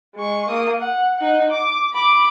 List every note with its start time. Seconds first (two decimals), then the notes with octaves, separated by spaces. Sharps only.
0.15 G#3 C#6
0.49 A#3 D#6
0.80 F#5
1.17 D#4 F#5
1.50 D6
1.93 B5 D6